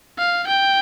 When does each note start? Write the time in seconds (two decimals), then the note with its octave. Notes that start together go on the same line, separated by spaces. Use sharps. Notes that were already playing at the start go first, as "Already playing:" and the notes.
0.19 F5
0.47 G5